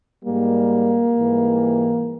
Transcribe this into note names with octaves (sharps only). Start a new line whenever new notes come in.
G#2 G3 A#3
G#2 E3 G3